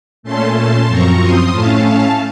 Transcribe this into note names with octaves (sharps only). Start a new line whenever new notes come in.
A#2 A3 C#4 A5 C6
A5 C6
F#2 F3 C4 A#5 C#6
C6 D#6
A2 A3 C#4 F5 A5